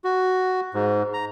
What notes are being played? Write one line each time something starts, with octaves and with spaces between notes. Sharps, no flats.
F#4
G#2
A#5